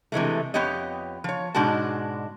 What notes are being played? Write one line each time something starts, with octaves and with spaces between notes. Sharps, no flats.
C3 E3 G#3 A3
F2 B3 G4 C#5 D#5
F3 C#5
G#2 B2 G#3 D4 F#4 A5